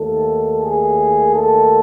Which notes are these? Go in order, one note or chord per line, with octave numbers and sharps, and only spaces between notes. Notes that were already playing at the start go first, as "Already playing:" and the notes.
Already playing: D#2 D#3 A3 A4
G#4
A4